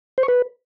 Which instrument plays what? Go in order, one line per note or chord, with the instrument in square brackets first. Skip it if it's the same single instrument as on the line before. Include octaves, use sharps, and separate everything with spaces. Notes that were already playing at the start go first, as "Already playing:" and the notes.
[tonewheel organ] C5
C#6
B4